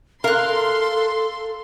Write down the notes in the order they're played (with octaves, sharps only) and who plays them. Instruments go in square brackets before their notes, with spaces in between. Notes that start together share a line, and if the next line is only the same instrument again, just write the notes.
[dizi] A4 [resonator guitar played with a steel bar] A#4 [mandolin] F5 F#6 [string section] C6